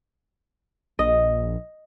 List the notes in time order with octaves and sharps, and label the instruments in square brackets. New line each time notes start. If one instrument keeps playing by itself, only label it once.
[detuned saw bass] A#1 [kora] D#5